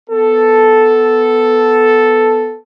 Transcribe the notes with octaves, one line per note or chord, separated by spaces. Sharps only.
B3 A4